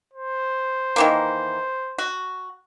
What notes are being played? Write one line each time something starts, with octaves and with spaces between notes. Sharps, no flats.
C5
D#3 E3 A#3
F#4